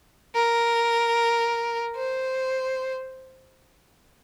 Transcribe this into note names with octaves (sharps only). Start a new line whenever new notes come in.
A#4
C5